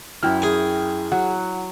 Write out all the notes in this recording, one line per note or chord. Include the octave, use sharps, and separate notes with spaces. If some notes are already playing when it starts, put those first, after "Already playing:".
F#2 E4 F#4 G5 F6
G#4 G#5
F#3 F#5